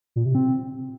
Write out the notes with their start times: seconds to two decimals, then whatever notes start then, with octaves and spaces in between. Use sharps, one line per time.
0.16 A#2
0.25 C3
0.35 C4